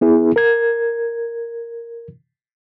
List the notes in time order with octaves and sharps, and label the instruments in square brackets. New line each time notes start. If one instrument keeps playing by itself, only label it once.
[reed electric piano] B3 E4 G#4
A#4 G#6